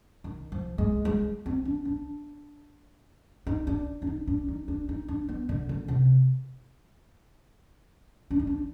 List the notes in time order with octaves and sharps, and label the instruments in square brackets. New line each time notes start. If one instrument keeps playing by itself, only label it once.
[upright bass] D#3
F3
G#3
G#3
C4
D4
D4
D#4
D4
D4
D#4
D4
D#4
D4
D#4
D4
B3
D3
D3
C3
D4
D#4
D4